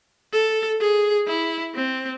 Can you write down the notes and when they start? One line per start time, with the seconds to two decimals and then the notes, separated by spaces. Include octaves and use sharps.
0.33 A4
0.80 G#4
1.28 E4
1.75 C4